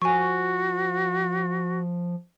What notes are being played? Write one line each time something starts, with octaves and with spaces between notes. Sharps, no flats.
F3 F#4 G#5 C#6